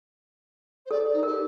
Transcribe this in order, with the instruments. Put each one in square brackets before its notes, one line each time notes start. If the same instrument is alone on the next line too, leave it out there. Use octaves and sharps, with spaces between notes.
[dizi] C5
[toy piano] A4 [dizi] D5
[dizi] D#4
[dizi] G4 [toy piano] A#4